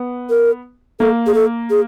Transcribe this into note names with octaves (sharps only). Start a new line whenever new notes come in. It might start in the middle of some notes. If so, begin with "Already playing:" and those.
Already playing: B3
A#4
A#3 A4
G#4
A4
G#4